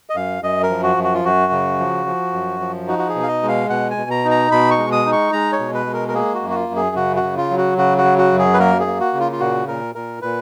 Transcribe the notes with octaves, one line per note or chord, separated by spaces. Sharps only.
D#5
F#2 F5
F#2 D#5
A#4
F3
F#4
F#2
F#4
F4
F#2 F#4
C#3
F3
F3
F#2
F3
D#4 F#4
F#4
G#4
B2
F5
D#5
G#3
F5
B2 F#5
G#5
B2
A#5
D#4
A#5
B2 B5
C#6
G#3
D#6
D#4
C#6
G#3 A#5
C#5
B2
B4
G#3
A#4
A#4
A#3 G#4
F#4
F#2
F#4
F4
F#2
G#4
C#3 F#4
F#4
C#3
F4
F#3
F#4
C#3 F#4
F#4
F#3
F#4
F#2
G#4
B4
A#3 A#4
G#4
A#3
F#4
C#3
F4
F4
A#2 F#4
A#2 A#4
A#2 A#4
A#2 B4